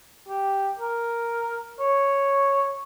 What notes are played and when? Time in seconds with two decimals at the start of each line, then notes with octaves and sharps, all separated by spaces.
0.28 G4
0.79 A#4
1.79 C#5